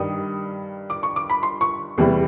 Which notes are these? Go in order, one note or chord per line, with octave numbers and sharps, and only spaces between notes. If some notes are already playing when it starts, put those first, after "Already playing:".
Already playing: G2 D#3 G3 D#6
D6
C#6
D6
B5
C6
C#6
E2 C3 E3 G3